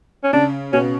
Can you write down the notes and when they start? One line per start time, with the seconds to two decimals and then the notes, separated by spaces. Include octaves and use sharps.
0.23 C#4
0.33 C#3 D4
0.73 B2 C#4